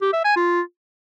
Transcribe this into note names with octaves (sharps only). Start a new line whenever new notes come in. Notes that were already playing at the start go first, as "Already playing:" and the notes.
G4
E5
G#5
F4